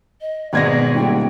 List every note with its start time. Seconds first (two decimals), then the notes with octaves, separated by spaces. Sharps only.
0.21 D#5
0.53 G#1 B2 G#3 D5 G#6 A#6
0.95 D#1 G5